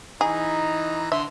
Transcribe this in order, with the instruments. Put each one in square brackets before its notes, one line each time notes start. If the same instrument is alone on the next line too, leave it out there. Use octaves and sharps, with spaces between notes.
[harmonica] E3 A#5 [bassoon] D#4 [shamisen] G#4
[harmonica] D3 C6 [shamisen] E5